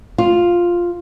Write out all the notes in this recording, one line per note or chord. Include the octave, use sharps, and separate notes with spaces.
F4